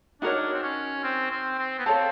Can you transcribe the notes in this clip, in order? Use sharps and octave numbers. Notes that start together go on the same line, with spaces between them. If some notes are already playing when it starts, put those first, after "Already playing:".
D4 D#4 F#4 A#4 C#5
C4
C#4
C4
C4
C4
B3
C4 A4 C#5 F5 A5